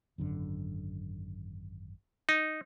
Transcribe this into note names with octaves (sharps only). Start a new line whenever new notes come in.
G#1 F#2 D3
D#4